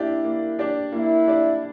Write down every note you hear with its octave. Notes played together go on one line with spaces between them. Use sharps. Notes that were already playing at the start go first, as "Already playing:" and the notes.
Already playing: A#3 D4 E4 G4 D5
A#3
D4 G4 D5
A#3 E4
D4 G4 D5